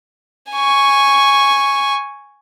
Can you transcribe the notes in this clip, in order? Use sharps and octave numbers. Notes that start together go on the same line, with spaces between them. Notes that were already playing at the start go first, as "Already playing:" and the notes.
G#5 C#6